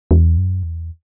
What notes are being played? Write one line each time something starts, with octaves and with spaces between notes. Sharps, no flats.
E2
F#2
E2